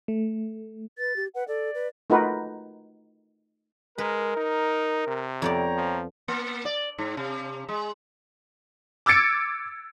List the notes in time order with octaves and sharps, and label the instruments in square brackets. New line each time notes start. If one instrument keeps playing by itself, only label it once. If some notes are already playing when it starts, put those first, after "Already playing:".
[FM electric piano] A3
[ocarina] B4 [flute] A6
[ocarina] G4
[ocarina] B4 [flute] F#5
[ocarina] A4 [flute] D5
[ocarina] B4
[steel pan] A3 D#4 F4 F#4 A#4 B4
[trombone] G#3 [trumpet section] A#4 [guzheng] B4
[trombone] D#4
C3
[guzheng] F2 B3 D5 [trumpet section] C#5 G5 A#5
[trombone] F3
[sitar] A#3
D5
G#2
C3
G#3
[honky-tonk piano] D6 E6 G#6 A6 C#7 D7